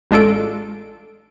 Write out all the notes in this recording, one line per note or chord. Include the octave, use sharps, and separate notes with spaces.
A1 G#3 D4 F4 A4 D7